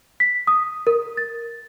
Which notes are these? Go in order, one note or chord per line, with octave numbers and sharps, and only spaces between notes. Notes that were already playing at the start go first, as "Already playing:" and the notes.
B6
D#6
A#4
A6